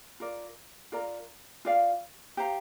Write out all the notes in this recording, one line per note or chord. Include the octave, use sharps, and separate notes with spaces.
F4 A#4 D5
F4 A#4 D5 A#5
F4 D5 F5
G4 C5 F5 A#5